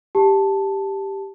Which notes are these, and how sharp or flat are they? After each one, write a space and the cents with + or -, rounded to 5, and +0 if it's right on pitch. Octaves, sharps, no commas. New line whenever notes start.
G4 +0 A5 +0